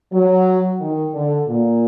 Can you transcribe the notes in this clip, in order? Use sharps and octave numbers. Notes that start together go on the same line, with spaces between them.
F#3
D#3
D3
A#2